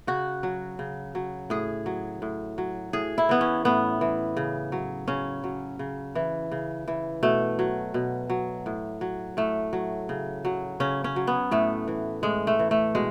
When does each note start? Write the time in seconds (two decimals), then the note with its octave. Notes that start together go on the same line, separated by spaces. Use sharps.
0.07 C#3 F#4
0.43 F#3
0.79 C#3
1.15 F#3
1.50 A2 G#4
1.86 F#3
2.22 A2
2.58 F#3
2.93 A2 G#4
3.18 E4
3.29 E3 B3
3.41 C#4
3.65 A2 B3
4.01 E3
4.37 C#3
4.72 F#3
5.08 C#3 C#4
5.44 F#3
5.79 C#3
6.15 E3
6.52 C#3
6.88 E3
7.23 B2 A3
7.59 F#3
7.94 B2
8.30 F#3
8.66 A2
9.01 F#3
9.37 A2 A3
9.73 F#3
10.09 C#3
10.45 F#3
10.80 C#3 C#4
11.04 C#4
11.16 F#3
11.27 B3
11.51 A2 A3
11.88 E3
12.23 A2 G#3
12.47 A3
12.59 E3
12.71 A3
12.95 B2 G#3